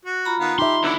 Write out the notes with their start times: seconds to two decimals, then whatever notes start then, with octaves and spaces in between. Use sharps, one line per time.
0.05 F#4
0.25 F4 A#5 B5
0.40 D#3 B3 F5
0.59 D#4 G4 E5 C6
0.83 B1 D3 F#3 E4